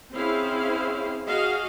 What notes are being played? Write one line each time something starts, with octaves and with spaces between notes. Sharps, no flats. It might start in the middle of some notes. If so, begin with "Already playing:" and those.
C4 C#4 E4 G#4 C5 F5
F#4 G#4 D#5 F5